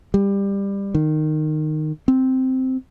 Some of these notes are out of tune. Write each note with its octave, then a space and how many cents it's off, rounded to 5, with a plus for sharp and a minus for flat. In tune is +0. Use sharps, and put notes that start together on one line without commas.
G3 +20
D#3 -15
C4 -5